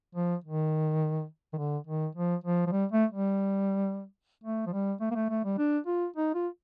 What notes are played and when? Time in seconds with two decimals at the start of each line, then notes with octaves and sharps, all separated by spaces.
0.15 F3
0.44 D#3
1.53 D#3
1.58 D3
1.87 D#3
2.16 F3
2.44 F3
2.67 F3
2.72 G3
2.92 A3
3.11 G3
4.44 A3
4.67 F3
4.73 G3
5.01 A3
5.11 A#3
5.15 A3
5.30 A3
5.45 G3
5.58 D4
5.86 F4
6.16 D#4
6.34 F4